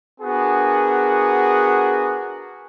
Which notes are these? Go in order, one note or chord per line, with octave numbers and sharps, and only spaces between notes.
B3 D4 F#4 G#4 A#4